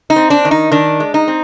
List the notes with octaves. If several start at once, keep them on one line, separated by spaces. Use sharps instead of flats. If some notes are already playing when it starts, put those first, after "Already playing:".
D#4
C4
D4
D#3
D#4
D#3 D4
G#3
D#4
C4